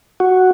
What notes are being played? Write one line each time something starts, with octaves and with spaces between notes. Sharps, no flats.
F#4